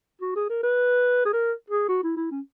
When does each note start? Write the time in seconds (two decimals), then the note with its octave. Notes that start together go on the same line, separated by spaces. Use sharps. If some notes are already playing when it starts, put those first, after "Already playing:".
0.21 F#4
0.36 G#4
0.49 A#4
0.63 B4
1.25 G#4
1.33 A#4
1.70 G#4
1.89 F#4
2.03 E4
2.16 E4
2.31 C#4